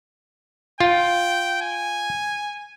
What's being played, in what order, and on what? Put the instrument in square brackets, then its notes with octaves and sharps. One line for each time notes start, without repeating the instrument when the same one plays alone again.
[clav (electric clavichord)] F4 [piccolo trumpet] G5
[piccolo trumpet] G#5